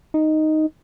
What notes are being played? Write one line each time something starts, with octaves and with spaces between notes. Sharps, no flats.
D#4